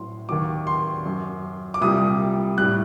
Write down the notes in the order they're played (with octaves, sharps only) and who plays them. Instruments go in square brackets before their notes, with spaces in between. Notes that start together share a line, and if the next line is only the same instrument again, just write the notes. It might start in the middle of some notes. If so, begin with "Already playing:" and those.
Already playing: [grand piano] A2 F#3 C6
D#2 D#3 F#3 D6
C6
F#2 F#3
D6
C2 A#2 G3 D#6
A2 G3 F#6